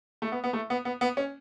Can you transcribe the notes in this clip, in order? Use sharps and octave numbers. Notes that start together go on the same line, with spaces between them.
A3
B3
B3
A3
B3
B3
B3
C#4